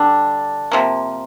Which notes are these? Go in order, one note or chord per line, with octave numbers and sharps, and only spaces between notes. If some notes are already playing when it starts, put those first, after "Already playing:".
Already playing: D3 G3 D4
C3 F3 A#3